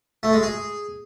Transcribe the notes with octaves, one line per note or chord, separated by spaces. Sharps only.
A3
G#3
G#4